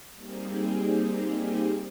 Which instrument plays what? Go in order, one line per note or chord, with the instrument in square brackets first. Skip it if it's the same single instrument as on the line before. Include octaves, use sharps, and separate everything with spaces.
[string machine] G3 A#3 C4 D#4 G4 G#4